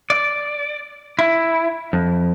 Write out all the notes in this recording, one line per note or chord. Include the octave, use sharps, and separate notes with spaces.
D5
E4
F2